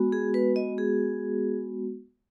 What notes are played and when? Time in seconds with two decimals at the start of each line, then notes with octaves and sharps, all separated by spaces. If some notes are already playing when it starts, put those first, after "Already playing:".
Already playing: G#3 B3 F#4
0.12 G#4
0.34 B4
0.56 D#5
0.78 G#4